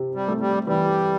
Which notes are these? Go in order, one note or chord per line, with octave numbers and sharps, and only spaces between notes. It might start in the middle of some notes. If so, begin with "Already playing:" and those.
Already playing: C3
G3
A3
G3
E3 G3